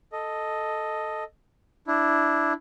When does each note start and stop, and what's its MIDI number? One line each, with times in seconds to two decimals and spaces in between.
0.12 1.24 69
0.12 1.24 75
1.87 2.53 62
1.87 2.53 64